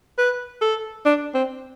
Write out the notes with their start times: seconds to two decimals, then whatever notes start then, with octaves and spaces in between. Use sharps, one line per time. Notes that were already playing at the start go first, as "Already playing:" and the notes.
0.18 B4
0.61 A4
1.05 D4
1.34 C4